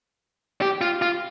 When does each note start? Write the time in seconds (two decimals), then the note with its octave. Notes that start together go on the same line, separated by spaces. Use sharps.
0.62 G4
0.81 F4
1.02 F4